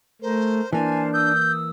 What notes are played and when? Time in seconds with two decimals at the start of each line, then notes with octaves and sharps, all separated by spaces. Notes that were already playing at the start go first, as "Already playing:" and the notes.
0.22 A3 A#4 C5
0.73 E3 A#3 D4 C5 G#5 A5 F6
1.13 D#6 E6 G6